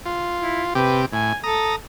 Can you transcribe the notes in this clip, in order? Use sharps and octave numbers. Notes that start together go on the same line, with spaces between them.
F4
E4
C3 G4 B4
A2 G#5
A4 A#5 D#6